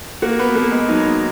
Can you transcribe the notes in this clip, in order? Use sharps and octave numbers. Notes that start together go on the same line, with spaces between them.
A#3 F#4
B3
A#3 B3
G#3
F#3 D#4